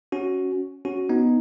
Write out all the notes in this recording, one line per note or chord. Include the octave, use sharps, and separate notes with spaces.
C#4 F#4
C#4 F#4
B3 D#4